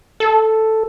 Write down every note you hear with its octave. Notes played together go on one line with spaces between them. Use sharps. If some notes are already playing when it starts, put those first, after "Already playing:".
A4